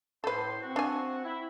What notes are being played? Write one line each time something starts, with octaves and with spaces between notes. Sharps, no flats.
A2 A4 B4 C5
C4 F#4
D4 G#5
E4